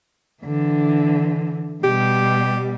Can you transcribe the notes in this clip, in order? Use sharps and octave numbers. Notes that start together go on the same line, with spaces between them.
D3 E3
B2 G3 G4